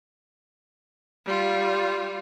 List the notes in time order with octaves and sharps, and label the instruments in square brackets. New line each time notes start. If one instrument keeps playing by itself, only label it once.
[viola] G3 F4